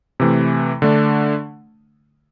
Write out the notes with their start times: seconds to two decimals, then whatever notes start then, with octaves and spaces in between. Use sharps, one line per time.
0.20 C3 E3 A3
0.82 D3 A3 D4